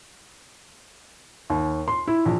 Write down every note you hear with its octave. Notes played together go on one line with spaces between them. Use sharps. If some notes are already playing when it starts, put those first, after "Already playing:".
D#2
C6
E4
A#1